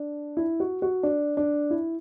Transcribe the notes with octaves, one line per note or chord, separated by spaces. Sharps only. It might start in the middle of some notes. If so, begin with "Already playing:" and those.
Already playing: D4
E4
F#4
F#4
D4
D4
E4